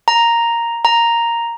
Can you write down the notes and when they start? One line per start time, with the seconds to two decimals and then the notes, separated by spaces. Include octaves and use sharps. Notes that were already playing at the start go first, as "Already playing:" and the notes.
0.08 A#5
0.85 A#5